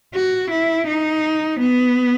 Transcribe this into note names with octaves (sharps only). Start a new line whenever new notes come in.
F#4
E4
D#4
B3